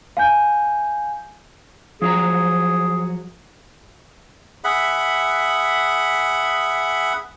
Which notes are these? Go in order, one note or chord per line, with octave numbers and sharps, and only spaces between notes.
F5 G#5 G6
F3 F#3 G#4 A#5
G#4 E5 F#5 B5